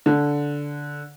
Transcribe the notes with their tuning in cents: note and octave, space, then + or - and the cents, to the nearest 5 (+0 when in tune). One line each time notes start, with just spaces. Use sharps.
D3 -10